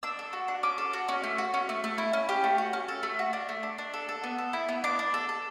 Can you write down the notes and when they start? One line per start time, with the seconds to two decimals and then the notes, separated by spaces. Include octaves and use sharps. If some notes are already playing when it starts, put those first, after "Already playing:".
0.03 D4 E6
0.19 A4
0.33 F#4
0.48 D4
0.63 C#4 D6
0.78 A4
0.93 F#4
1.08 C#4
1.23 A3
1.38 F#4
1.54 C#4
1.69 A3
1.84 A3
1.98 E4
2.13 C#4
2.29 G4
2.44 A3
2.58 F#4
2.73 C#4
2.88 A4
3.03 A3
3.19 F#4
3.33 D4
3.49 A3
3.63 D4
3.78 D4
3.94 A4
4.09 A4
4.24 B3
4.38 A4
4.53 E4
4.69 B3
4.84 D4 D6
4.99 D4
5.14 A4
5.29 A4